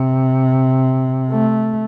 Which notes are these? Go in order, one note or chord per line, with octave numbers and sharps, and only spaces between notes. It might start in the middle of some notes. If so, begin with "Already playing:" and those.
Already playing: C3
A3